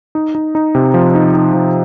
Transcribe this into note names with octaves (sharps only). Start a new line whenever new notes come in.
D#4
D#4
D#4
C3
F3
D#4
D#4
F3